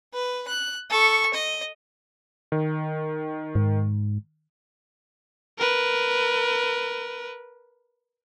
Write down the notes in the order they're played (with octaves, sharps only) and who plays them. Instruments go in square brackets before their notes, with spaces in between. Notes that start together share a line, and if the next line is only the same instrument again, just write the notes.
[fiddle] B4
F#6
A4 C#6
D#5
[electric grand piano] D#3
[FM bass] G#2
[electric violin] A#4 B4